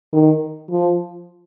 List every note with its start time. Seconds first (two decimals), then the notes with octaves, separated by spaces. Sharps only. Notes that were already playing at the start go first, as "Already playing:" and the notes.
0.13 D#3
0.71 F3